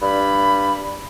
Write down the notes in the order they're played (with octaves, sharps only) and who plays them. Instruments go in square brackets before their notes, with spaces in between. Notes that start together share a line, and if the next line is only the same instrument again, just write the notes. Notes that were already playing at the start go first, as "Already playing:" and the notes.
[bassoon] G2 [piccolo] B5